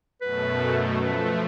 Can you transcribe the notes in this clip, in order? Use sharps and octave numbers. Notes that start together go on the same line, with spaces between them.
F#2 B2 A3 B4
F3 A3 B4